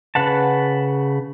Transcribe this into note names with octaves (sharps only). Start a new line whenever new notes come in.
C#3 B4 F#5 A5